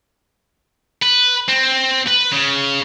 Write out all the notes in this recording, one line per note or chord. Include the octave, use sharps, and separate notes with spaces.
B4
C4
B4
C#3